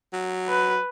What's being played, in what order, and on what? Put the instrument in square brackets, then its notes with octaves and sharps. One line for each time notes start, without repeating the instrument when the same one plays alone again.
[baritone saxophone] F#3
[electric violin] B4